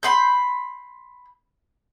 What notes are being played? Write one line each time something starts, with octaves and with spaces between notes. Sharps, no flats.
B5 C6 G6